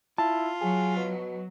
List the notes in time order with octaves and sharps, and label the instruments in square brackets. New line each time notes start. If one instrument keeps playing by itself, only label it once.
[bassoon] E4 [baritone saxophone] F4 [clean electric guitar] A5
[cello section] F#3 [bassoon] G#4
[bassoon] B2